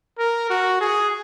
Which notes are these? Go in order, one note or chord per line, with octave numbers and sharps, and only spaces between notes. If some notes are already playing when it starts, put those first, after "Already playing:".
A#4
F#4
G#4